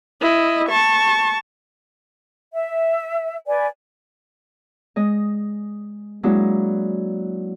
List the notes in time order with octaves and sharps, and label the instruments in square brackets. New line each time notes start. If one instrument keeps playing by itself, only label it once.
[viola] E4 D#5
A5 C#6
[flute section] E5
B4 D5 G#5
[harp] G#3 D#5
F#3 G#3 A#3 D4 E4 F#4